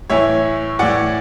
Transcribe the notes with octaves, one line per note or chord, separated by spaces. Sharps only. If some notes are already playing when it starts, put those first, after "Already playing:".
A2 E3 C#5 E5
A2 E3 D5 F#5